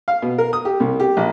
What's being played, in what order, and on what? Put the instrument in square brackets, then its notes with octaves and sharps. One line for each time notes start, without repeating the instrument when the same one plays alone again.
[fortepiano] F5
B2
A#4
D#6
G4
C2
G4
A#1